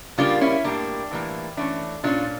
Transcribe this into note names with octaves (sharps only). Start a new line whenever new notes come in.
C#3 G3 A#3 D4 F4
C#4 E4
A2 G3 A#3 D4
A2 E3 G3 A#3
E3 A3 C#4 D4
A#2 A3 C#4 D4 F4